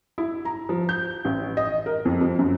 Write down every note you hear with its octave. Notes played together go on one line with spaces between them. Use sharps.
E4
A#5
F3
G6
A1
D#5
A#4
F2
F3
F#2